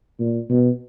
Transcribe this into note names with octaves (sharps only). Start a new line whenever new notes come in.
A#2
B2